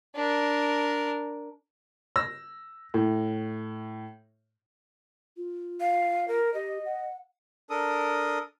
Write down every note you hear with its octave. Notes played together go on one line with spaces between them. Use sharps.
D4 A#4
E6 A#6
A2
F4
F5
A#4
G4 D#5
F#5
D4 A4 A#4 D#6